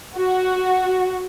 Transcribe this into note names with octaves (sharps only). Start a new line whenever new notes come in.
F#4